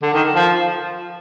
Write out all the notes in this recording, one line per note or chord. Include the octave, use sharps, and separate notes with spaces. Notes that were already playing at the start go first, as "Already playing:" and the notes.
D3
D#3
F3